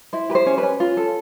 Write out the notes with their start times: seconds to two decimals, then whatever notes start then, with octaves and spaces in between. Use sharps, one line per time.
0.13 E4 C5
0.30 G4 B4
0.35 C5
0.46 C#4
0.58 B4
0.63 C#4
0.80 F4
0.97 A4